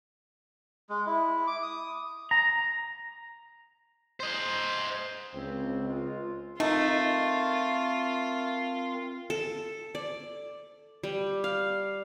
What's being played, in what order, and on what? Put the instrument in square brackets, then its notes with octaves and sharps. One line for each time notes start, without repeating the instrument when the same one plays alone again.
[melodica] G#3
E4
D6
D#6
[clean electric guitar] A#5
[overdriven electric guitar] C5 D#5
[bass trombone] C#2 [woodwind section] C4
[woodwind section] G#3 F4
[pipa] A3 [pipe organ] C4 A#4 [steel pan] D#4 [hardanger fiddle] F4
[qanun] A4
D5
G3
F5